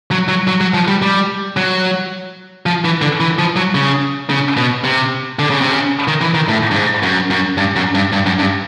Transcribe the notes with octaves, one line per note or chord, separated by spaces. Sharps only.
F#3
F#3
F#3
F#3
F3
G3
G3
F#3
F3
E3
D3
E3
F3
F#3
C#3
C#3
B2
C3
D3
C#3
C3
C#3
D#3
E3
D#3
A2
G2
G#2
F#2
F#2
G2
F#2
G2
G2
F#2
G2